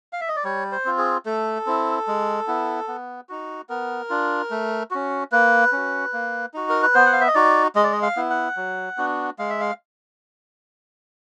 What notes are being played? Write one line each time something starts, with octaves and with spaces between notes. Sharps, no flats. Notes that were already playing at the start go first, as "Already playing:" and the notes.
F5
E5
D#5
D5
G3 C#5
C5
C4 F4
G#4
A3 A4
C4 E4
G#3
B3 E4
B3
D#4 F#4
B3 A#4
D4 F4
A3
C#4 F#4
A#3 B4
C#4 F#4
A#3
D#4 F#4
A#4
B4
B3 C5
F#5
F5
E5
D#5
D#4 F#4 D5
G#3 D#5
D5
D#5
F5
B3 E4
F#5
F#3
B3 D4 F#4
G#3 F5
E5
F5